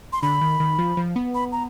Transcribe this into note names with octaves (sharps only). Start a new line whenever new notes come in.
C6
D3 B5
D#3
D#3
F3
F3
B3
B5
A#5